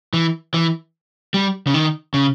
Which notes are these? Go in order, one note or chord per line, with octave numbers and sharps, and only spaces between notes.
E3
E3
G3
C#3
D#3
C#3